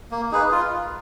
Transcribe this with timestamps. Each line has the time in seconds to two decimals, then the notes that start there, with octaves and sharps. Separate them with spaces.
0.11 A#3
0.31 D#4 G#4 B4
0.51 F4